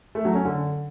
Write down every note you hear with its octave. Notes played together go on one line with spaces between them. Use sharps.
A3
F#3
C#4
D3